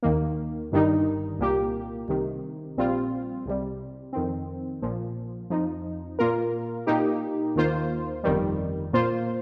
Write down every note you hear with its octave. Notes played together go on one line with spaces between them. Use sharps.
D#2 D#3 A#3
G1 G2 D#3 G3 D#4
C2 A#2 A#3 G4
C2 C3 D#3
A#1 A#2 G3 C4 F4
C2 C3 G3
F2 D#3 C4
A#1 A#2 F3
F2 F3 D#4
A#2 A#3 F4 A#4
A#2 A#3 D#4 G4
D#2 D#3 A#3 F4 C5
G1 F2 D#3 G3
A#2 A#3 F4 C5